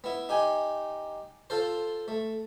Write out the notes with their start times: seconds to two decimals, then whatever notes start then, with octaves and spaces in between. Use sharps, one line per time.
0.04 B3 E4
0.29 D#4 G4 G#5
1.50 F4 A4 C5
2.08 A3